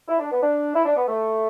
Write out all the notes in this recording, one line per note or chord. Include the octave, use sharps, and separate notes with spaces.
E4
D4
B3
D4
E4
D4
B3
A3